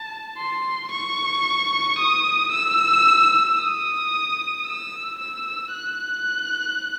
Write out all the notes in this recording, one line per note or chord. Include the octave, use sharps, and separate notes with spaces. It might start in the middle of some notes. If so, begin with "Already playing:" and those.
Already playing: A5
C6
C#6
D#6
E6
D#6
E6
E6
F#6